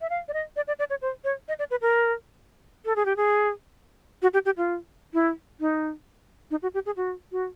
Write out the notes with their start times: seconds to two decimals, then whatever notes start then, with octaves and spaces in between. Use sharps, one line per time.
0.01 E5
0.10 F5
0.28 D5
0.33 D#5
0.56 D5
0.67 D5
0.79 D5
0.90 C#5
1.02 C5
1.24 C#5
1.48 D#5
1.59 D5
1.71 B4
1.81 A#4
2.85 A4
2.96 G#4
3.05 G4
3.16 G#4
4.22 F#4
4.33 G4
4.45 G4
4.57 F4
5.14 E4
5.60 D#4
6.51 D#4
6.62 F#4
6.74 G4
6.86 G#4
6.97 F#4
7.32 F#4